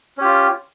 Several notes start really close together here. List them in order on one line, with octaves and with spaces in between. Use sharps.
C#4 G4 F4